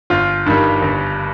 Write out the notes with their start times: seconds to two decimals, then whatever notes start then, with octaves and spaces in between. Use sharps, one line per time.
0.10 G1 F4
0.46 G2 D#3 G3
0.82 G1